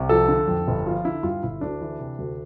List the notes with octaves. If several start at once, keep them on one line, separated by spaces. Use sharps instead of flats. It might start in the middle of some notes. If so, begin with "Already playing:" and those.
Already playing: C2
F3 A4
D3
F2
G1
F3 F4
D3 E4
G2 F4
G1 E4
D2 D4
E3
C3
D2